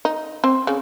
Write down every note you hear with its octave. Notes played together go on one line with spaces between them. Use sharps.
D#4
C4 C5
C#3